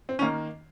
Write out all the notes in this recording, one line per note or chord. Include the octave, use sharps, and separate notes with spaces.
C4
D#3 A#3 C#4